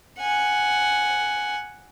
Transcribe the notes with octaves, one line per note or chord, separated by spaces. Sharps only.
F#5 G#5